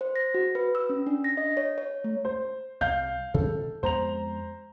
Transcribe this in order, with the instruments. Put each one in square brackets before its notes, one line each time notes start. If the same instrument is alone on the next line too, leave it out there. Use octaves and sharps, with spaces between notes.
[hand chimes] C5
A#6
F#4
B4
E6
C#4
D4
A#6
D#5
C#5
C#5
A3
[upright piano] C5
[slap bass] C2 G3 [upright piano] F5 G6
[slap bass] C3 D#3 E3 [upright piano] A4
[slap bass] F2 G#3 B3 [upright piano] C5 A#5 F7